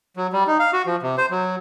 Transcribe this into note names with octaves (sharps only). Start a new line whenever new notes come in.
F#3
G3
D#4
F5
F#4
F3
C3
C5
F#3